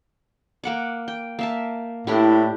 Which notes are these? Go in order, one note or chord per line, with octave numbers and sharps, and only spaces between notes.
A#3 F#5 D6
G5
A#3 E5 A5
A2 D4 E4 G4